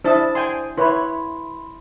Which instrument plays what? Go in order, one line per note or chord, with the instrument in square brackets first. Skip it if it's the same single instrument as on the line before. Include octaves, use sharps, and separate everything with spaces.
[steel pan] D4 E4 A5 [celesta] C5 D#6
[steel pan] G5 G#5 C6
[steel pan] E4 B4 C#5 [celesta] B5 C6